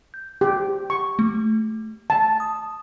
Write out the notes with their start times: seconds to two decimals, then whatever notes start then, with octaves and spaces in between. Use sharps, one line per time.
0.14 G6
0.41 G4
0.90 C#6
1.19 A3
2.10 A5
2.40 D#6